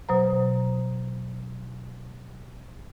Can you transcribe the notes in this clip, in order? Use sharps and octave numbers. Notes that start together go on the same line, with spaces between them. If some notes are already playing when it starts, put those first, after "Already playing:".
B2 F#3 C5 A#5